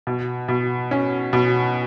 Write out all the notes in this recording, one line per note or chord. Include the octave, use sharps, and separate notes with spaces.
B2
B2
C#4
B2